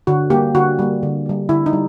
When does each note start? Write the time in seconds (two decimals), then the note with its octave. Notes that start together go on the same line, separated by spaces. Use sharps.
0.07 D3 F#4
0.30 G3 A#3 G4
0.55 D3 F#4
0.79 G3 A#3
1.03 D3
1.26 G3 A#3
1.49 D3 E4
1.66 D#4
1.73 G3